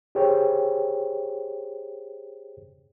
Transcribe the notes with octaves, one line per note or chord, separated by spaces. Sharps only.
G4 G#4 C5 C#5 G5